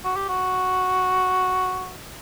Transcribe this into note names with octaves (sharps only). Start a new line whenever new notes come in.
F#4
G4
F#4